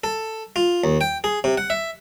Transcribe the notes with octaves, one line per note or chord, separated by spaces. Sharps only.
A4
F4
D#2
G5
G#4
C3
F#5
E5